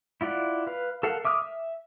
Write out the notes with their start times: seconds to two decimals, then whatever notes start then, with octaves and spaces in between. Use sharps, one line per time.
0.21 E4 F4 D5 F#5
0.67 B4 F5
1.03 A4 A#4 F5 F#5
1.25 E5 D6 D#6 F6
1.42 E5